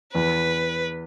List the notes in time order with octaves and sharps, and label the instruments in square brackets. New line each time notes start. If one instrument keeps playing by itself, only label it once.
[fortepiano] E2 [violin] B4